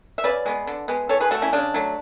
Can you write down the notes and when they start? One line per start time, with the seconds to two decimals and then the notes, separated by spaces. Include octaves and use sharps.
0.18 E5
0.24 C#3 B4 D5
0.46 G#3 B3
0.67 D3
0.88 G#3 B3
1.09 E3 A4 C#5
1.20 G#4 B4
1.31 A3 F#4 A4
1.42 C#4 E4
1.53 C#3 D4
1.74 F#3 A3